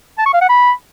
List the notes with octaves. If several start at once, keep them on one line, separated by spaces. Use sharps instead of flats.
A5
C#6
F5
F#5
B5